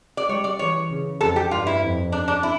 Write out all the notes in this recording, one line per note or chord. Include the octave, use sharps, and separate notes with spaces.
D5
G3 C#5
D5
E3 C#5
C#3
F2 A4
G4
G2 F4
E4
F2
D4
D4
E4